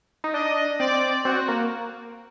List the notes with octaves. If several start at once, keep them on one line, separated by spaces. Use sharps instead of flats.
D#4
D4 D#5
C4 D5
C4 F#4
A#3